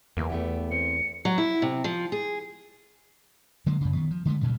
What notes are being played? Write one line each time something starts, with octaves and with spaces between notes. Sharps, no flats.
E2 E3 A3 A#3
A3 B3 G4
C4 C#7
F#3
E4
C3
F3
G#4
D3 F#3 G#3 A#3
F#2 C#3
D#3 B3
F3
D3 G#3 A3
D2 A#2 C#3 G3